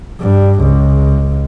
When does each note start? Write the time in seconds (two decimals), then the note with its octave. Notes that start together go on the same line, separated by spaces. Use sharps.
0.21 G2
0.62 C#2